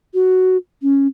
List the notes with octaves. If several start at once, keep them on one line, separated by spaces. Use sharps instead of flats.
F#4
C#4